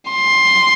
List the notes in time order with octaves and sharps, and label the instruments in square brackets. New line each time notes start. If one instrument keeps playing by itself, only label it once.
[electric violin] C6